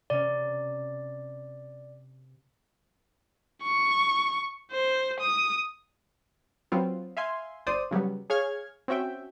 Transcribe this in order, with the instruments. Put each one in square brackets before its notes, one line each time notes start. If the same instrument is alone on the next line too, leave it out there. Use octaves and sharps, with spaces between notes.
[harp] C3 C#4 [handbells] D5
[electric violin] C#6
C5
D#6
[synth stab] F#3 B3 C4 F4
E5 F5 G#5 C6
G1 C5 D5 D#6
C#3 F#3 G3 B3
G#4 C#5 F5 F6 G#6
C4 C#4 F#4 E5 G5